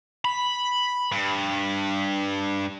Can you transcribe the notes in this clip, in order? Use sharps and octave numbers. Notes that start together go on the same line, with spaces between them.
B5
G2